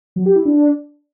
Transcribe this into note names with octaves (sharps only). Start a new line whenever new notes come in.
F#3
G4
E4
D4